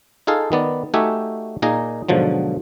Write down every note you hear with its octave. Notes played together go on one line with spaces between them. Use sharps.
D#4 F4 G#4 A4 F5
D#3 B3 D5
A3 D#4 F#4 G4 E5 G#5
A#2 A#3 D#4 G#4 A#5
G#2 B2 D3 F3 F#3